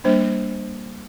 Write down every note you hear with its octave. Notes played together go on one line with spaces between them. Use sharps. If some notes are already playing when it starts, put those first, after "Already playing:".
G3 A#3 D4 C5